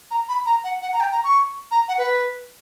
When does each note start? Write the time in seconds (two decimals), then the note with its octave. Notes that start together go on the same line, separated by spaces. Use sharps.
0.11 A#5
0.29 B5
0.46 A#5
0.64 F#5
0.82 F#5
0.93 A#5
1.00 G5
1.12 A#5
1.24 C#6
1.71 A#5
1.88 F#5
1.98 B4